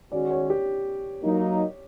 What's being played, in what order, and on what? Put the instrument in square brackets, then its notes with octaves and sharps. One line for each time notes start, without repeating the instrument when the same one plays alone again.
[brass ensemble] D#3 G#3 C#4 F#4 [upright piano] D5
[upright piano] C#5
G4
[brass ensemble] F#3 A#3 D#4